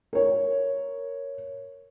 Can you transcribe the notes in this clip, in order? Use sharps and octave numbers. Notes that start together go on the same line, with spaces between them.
A#4 C#5